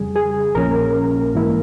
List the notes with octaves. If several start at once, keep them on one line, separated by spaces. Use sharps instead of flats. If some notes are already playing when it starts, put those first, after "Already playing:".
Already playing: F2 C#3 G3 G#4
G#4
A#1 A#2 F3 A#3 C#4 A#4
G#2 E3 A#3 E4